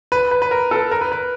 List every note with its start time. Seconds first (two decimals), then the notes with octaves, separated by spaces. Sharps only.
0.12 B4
0.31 B4
0.42 B4
0.51 A#4
0.71 A4
0.91 A#4
1.01 B4
1.12 B4